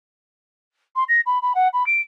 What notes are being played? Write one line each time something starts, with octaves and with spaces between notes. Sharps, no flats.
C6
A#6
B5
B5
F#5
B5
D7